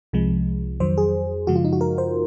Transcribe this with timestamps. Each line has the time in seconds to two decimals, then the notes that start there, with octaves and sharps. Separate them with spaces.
0.13 C2 C3 F3 G#3
0.80 F2 D#3 F#3 C5
0.98 G#4
1.47 F#2 C#3 F3 G#3 F#4
1.56 F4
1.64 D#4
1.73 F#4
1.81 A#4
1.98 C5